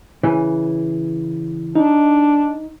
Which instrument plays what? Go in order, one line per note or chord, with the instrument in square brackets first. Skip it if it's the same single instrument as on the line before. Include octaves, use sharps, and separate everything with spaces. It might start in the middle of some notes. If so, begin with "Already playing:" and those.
[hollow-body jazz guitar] C#3 E3
[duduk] D4 [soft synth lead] D#4